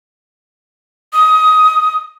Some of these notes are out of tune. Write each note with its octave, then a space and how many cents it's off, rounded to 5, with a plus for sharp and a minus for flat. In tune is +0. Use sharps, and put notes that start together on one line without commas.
D#6 +20